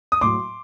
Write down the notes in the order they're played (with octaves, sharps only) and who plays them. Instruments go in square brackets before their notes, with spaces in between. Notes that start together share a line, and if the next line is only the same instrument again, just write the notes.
[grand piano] D#6
A2 F#3 C6 D6